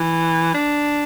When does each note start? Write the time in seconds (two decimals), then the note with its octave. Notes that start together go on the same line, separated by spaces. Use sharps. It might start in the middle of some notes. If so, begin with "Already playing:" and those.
Already playing: E3
0.55 D4